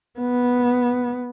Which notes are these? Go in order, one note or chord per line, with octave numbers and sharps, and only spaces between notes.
B3